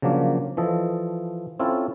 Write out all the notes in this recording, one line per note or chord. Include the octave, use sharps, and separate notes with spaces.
C#3 F3 F#3 A#3 D4
E3 F3 A4 D#5
C4 C#4 E4 F4 A4